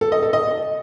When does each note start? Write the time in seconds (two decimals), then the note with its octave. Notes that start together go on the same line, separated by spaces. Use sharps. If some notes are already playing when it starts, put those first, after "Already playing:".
0.01 A4
0.12 D#5
0.23 A4
0.33 D#5